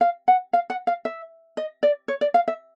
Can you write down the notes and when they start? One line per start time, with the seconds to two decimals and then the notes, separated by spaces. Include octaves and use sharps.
0.01 F5
0.28 F#5
0.53 F5
0.70 F#5
0.87 F5
1.05 E5
1.57 D#5
1.83 D5
2.08 C#5
2.21 D5
2.34 F5
2.48 E5